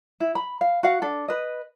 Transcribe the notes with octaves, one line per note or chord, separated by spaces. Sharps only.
E4
B5
F5
F#4 F5 F#5
D4 A4
B4 D#5